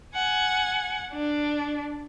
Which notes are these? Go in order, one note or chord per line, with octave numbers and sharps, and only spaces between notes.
F#5 G#5
D4